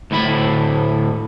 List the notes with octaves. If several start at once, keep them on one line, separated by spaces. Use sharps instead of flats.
D2 A2 E4 E5 B5